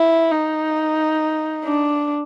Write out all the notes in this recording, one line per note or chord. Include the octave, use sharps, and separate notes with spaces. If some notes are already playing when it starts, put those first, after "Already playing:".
Already playing: E4
D#4
D4